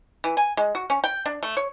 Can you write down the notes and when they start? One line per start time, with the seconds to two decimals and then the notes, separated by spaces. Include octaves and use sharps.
0.24 E3
0.37 G#5
0.57 G#3
0.75 F#4
0.90 C#4
1.04 G5
1.26 D4
1.43 A3
1.57 C#5